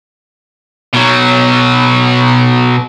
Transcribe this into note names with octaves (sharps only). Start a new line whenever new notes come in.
B2 F#3